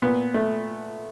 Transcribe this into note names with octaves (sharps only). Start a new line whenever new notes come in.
A#2 B3
A3